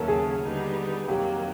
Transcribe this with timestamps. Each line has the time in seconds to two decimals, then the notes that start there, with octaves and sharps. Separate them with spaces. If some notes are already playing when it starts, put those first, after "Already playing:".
Already playing: D#2 C#3 F#3 A3 C#4 A4 A#4
0.08 G#4
0.42 D3 G3 B3 D#4
1.08 F2 C3 D#3 F#3 A#3 G4